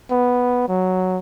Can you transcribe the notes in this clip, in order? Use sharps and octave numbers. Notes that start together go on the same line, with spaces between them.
B3
F#3